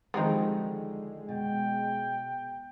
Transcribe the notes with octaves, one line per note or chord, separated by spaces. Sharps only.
D3 D#3 F3 G3 G#3 C4 D#4
B2 G5